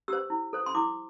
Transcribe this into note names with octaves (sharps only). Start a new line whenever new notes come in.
G4 C5 E6
E4
A4 C5
C6
E4 D6